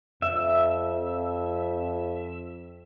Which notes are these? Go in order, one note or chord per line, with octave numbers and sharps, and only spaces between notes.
F2 E5